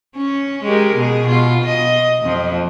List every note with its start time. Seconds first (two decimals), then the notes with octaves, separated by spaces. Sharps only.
0.16 C#4
0.64 G#3 G4 A#4
0.97 B2 G#4
1.27 B2 F4
1.66 D#5
2.23 F2 F3